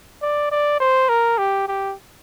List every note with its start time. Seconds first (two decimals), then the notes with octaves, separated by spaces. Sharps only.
0.22 D5
0.52 D5
0.80 C5
1.09 A#4
1.38 G4
1.68 G4